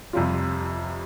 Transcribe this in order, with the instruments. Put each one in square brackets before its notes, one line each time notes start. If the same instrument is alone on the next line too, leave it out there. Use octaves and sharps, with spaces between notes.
[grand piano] F2 C3 G3 F4